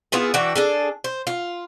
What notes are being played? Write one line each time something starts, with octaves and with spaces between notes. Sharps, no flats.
B3 E4 F4 G#4
E3 D4 F#4 G5
D4 G#4 A4
C5
F4